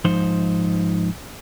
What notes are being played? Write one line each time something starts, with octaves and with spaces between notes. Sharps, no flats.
G#2 F3 D#4 C5